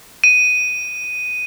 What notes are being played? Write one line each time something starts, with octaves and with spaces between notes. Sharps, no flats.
D#7